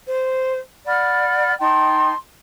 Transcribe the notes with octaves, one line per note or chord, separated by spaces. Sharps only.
C5
D5 F#5 B5 F6
D#4 G5 A5 C6